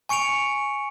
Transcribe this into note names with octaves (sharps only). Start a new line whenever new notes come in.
G#5 C#6 C#7 D7 F7